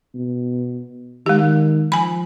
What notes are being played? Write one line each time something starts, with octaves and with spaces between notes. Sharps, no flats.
B2
D#3 G#3 G4
F3 G#5 B5